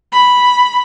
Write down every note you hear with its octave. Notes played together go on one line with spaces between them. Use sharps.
B5